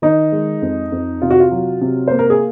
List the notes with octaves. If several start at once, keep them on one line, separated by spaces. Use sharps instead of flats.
D#3 D#4
G#3
F2
F2
C3 F4
F#4
F4
F#3
C3
A#3 C5
A#4
G#4